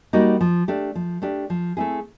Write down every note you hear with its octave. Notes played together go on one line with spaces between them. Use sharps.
G3 A#3 D#4 F#4
F3
A3 D4 G4
F3
A3 D4 G4
F3
A3 C4 E4 G#4